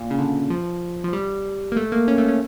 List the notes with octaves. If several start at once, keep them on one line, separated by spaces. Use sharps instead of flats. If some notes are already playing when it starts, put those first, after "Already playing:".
Already playing: A#2
C#3
D3
F3
F3
G3
A#3
A3
A#3
C#4
A3
C#4